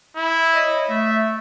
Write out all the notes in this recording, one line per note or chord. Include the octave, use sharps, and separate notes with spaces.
E4
C#5 D#5
A3 E5